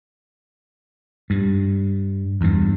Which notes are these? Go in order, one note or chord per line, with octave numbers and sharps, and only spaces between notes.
G2
E2 G2